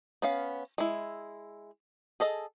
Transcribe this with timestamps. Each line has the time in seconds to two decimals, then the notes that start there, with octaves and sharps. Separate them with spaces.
0.22 B3 C#4 F5
0.78 G#3 E4
2.20 G#4 A4 D#5